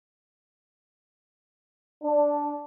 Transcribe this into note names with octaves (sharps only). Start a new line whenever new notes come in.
D4